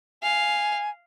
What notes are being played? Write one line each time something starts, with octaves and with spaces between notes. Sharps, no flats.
F5 G#5